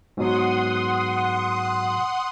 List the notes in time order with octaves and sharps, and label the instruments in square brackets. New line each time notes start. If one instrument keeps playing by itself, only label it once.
[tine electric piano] G#2 B2 F#3 [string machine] F#5 C6 D#6